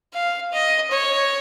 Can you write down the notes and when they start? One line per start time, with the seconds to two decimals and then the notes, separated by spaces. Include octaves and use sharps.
0.13 F5
0.53 D#5
0.91 C#5